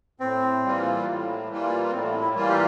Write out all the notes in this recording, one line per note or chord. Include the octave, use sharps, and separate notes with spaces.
A2 C4
E3 G3 A#3 F4
A2
E3 G3 A#3 F4
A2 C4
E4
E3 G3 A#3 F4
G4